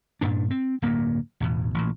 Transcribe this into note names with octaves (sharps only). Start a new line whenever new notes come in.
G2 A#2 D4
C4
D1 G2 A#3
A1 E2 B2
A1 A#2